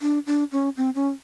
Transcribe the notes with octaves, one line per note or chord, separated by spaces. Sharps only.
D4
D4
C#4
C4
C#4